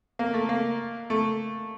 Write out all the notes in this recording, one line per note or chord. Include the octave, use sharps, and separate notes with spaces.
A#3
A3
A#3
A3